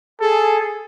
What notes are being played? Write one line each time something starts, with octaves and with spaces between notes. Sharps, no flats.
G#4 A4